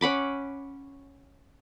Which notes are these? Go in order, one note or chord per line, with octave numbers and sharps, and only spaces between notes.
C#4 F#5 B5 D6